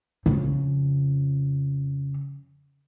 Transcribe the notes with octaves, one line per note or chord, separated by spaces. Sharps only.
F2 C#3